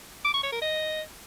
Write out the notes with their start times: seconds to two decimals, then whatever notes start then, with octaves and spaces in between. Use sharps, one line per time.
0.25 D6
0.34 C#6
0.43 C#5
0.52 A#4
0.61 D#5